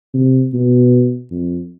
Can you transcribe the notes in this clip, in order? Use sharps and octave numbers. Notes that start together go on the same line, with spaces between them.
C3
B2
F2